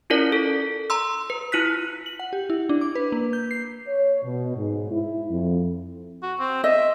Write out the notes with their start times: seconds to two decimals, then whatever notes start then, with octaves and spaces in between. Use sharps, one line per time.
0.10 C#4 E4 F4 A#4 D5
0.32 A4
0.90 A#5 C6 E6
1.30 B4
1.52 E4 F4 F#6 B6
2.06 F#7
2.19 F#5
2.33 G4
2.50 E4
2.69 D4
2.81 D6
2.95 B4
3.12 A#3
3.33 G6
3.51 C7
3.88 C#5
4.24 B2
4.57 G#2
4.92 E4
5.31 F2
6.23 F#4
6.39 C4
6.64 D#5 E5